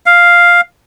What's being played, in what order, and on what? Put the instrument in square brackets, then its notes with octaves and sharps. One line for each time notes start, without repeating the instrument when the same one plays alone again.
[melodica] F5